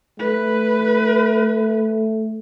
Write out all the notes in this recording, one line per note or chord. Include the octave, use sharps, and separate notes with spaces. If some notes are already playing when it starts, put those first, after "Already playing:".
A3 B4